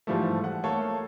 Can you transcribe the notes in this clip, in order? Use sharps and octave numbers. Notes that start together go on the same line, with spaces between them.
G#2 E3 F3 G3 A3
F#5
A3 A#3 A4 C#5 F5